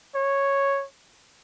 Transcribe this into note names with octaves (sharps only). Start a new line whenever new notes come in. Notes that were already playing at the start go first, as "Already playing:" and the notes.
C#5